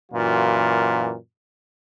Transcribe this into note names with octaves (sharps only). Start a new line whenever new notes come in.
F#2 A#2 E3 F4 F#4